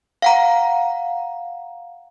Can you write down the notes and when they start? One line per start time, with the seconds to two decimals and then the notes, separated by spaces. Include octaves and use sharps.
0.22 F5 F#5 A#5